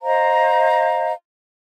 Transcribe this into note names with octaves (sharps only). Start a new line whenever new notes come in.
C5 D#5 F5 A#5